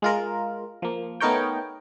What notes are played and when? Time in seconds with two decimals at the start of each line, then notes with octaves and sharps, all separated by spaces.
0.02 G#3 F4 A#4
0.82 F3 A#3
1.20 A3 B3 D#4 A#4 C#5 G5